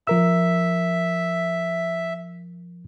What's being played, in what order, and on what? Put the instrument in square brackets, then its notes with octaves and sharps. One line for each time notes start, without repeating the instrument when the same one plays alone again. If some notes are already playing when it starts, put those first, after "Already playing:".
[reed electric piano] F3 A#4 E6 [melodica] E5